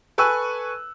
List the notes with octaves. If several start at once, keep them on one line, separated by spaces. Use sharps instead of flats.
A4 B4 G#5 C#6 E6 F#6